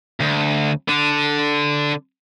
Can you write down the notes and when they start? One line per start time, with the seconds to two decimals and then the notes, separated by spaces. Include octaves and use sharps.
0.21 D2
0.89 D3 D4